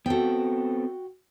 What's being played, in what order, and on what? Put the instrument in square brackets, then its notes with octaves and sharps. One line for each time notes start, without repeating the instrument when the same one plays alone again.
[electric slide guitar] B3 C4 A4 [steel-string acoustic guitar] F#4 G5